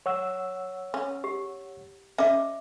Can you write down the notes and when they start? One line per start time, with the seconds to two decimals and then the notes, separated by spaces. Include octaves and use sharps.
0.06 C#5 F#5 E6
0.94 C#4
1.24 G4
2.18 C#4 D#5 E5 D6